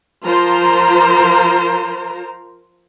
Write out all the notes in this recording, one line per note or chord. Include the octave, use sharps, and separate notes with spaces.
F3 F4 A#4 C5 A#5